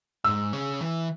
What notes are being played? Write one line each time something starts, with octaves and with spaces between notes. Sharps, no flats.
G#2 E6
C#3
E3